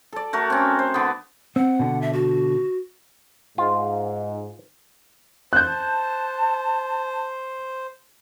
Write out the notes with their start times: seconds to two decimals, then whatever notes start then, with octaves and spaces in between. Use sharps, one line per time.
0.13 A4 D5
0.33 A3 F#4 A#4
0.50 C4 C#4
0.79 C5
0.94 D3 B3
1.56 C4 F#5
1.79 B2 D3
2.02 E5
2.13 F#4
3.58 G#2 F4
5.53 C5 A5 F#6 G6